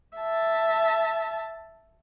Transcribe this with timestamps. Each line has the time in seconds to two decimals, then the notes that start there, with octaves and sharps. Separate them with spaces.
0.17 E5 A5